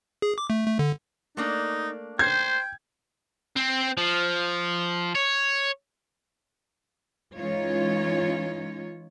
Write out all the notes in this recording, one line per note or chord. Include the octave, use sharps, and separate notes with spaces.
G#4
D6
A3
A3
D3
A3 A#3 D4 D#4
C5 G5 G#6
C4
F3
C#5
E3 G#3 C#4 D#4 F4 C#5